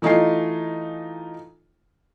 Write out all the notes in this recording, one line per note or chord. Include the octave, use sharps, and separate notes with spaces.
E3 A3 D#4 F4 G#5 C7